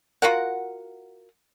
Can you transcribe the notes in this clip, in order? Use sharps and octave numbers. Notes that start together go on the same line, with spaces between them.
F4 F#4 A#4 F#5